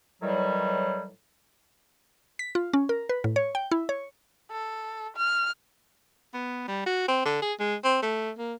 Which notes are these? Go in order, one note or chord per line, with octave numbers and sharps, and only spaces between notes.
A2 D#3 E3 F#3 G3
B6
F4
C#4
A#4
B4
A2
C#5
G5
E4
C#5
A4
F6
B3
G3
F#4
C4
D3
G#4
G#3
C4
A3
A#3